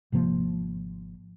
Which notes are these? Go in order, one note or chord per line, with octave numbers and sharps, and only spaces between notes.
G#1 C3 F3 A#3